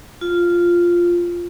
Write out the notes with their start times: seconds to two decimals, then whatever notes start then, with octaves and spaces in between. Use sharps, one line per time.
0.21 F4